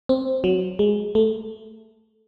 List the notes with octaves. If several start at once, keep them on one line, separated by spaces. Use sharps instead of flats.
C4
F#3
G#3
A3